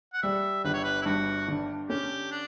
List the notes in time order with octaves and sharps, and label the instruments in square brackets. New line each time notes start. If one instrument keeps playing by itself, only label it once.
[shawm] F#5
[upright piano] G3 [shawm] E5
[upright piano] G1 [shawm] B4
[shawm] C#5
B4
E4
[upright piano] G2 [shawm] F#4
[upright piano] D3
[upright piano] C#4 [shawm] G4
[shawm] D4